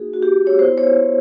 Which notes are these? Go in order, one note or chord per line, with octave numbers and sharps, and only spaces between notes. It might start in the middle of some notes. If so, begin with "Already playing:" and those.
Already playing: A#3 D#4 F#4 G#4
F#4
G4
C#5
B3 E4 C5
C#5